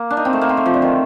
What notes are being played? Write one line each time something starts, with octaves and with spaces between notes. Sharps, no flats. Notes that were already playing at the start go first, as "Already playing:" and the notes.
Already playing: A#3
D4
D#4
C4
A3
A#3
C4
A3
F3
D3
D#3